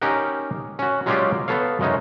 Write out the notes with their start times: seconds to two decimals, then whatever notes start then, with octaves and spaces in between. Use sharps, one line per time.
0.02 C#4 D#4 G4 A#4 D#5 F#5
0.79 C#4 F#4
1.06 F#3 G#3 C#4 F4 G4 D5
1.48 B3 A4 C#5 F5
1.80 F#2 C#3 G#3 C#4 D#4